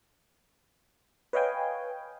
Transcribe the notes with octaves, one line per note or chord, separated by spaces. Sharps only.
B4 C#5 D#5 F5 G5 G#5